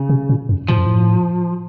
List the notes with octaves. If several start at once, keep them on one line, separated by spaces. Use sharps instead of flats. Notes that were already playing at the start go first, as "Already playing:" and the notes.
Already playing: C#3
C3
A#2
F#2
A2 F3
F#2
A2